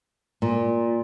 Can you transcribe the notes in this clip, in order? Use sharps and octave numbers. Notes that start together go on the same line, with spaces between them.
A#2